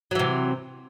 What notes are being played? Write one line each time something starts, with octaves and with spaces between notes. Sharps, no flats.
C3 E3 F#3